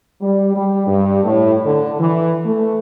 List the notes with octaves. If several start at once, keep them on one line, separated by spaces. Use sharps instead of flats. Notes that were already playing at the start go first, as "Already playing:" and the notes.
G3
G3
G2
A2
D3
E3
A3